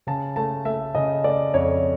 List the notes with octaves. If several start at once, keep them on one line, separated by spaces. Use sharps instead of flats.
C#3 A5
A3 A5
A3 E5
C#3 D#5
A3 D5
F2 C#5